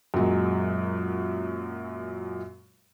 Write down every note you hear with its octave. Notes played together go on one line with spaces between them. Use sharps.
F#2 A#2 F#3 G#3